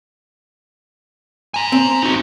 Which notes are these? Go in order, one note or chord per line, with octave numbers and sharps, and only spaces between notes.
G#5 A#5
C4
D#4 F#4